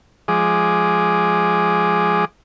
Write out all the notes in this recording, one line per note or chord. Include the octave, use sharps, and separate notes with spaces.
F3 G#3 G#4 D6